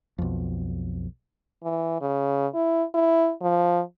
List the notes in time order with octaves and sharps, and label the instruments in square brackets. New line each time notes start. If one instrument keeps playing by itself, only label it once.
[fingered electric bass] B1 F2
[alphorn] E3
C#3
E4
E4
F3